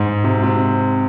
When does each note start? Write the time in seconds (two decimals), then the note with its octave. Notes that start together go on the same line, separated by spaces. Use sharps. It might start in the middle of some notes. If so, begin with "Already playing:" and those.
Already playing: G#2
0.24 C3
0.43 C3